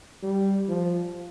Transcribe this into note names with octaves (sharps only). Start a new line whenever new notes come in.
G3
F3